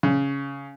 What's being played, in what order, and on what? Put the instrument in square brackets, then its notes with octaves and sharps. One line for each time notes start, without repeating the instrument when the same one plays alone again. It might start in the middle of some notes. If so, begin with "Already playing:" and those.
[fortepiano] C#3